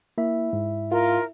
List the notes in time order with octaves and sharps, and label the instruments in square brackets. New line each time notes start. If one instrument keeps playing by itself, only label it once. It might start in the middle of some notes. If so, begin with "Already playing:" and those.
[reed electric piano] A#3 [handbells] E4 E5
[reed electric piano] G#2
[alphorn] F4 [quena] A#4